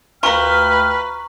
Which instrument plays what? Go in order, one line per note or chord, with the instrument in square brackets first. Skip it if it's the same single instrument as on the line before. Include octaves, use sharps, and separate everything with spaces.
[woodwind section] D2 G5 F6 [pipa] F4 A#4 [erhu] B4 [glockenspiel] A#5 C#6